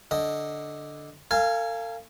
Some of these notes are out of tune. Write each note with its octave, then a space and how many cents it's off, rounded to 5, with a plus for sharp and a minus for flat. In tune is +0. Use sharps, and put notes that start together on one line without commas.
D3 +0 D#5 +5
A4 +45 F5 -15 G#5 +0